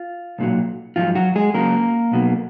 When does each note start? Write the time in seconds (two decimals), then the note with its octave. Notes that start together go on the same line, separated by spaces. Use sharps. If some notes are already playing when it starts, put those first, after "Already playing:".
Already playing: F4
0.39 B1 A#2 F#3
0.96 G#2 F3 F#3 F4
1.15 F#3 F#4
1.36 G#3 G#4
1.54 C#2 C#3 F#3 A#3 A#4
2.12 B1 B2 F#3